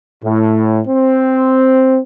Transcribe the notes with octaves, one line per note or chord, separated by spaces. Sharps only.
A2
C4